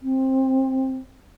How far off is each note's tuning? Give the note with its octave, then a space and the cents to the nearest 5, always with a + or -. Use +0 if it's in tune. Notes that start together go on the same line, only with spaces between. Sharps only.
C4 +15